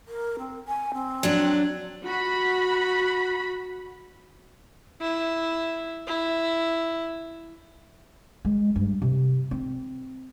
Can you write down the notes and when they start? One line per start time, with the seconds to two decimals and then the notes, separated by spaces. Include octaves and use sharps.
0.08 A#4
0.39 C4
0.68 G#5
0.94 C4
1.23 F#3 D4
2.04 F#4 B5
5.01 E4
6.07 E4
8.45 G#3
8.76 G2
9.02 C3
9.51 C4